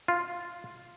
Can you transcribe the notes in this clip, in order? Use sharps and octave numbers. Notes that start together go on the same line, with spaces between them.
F4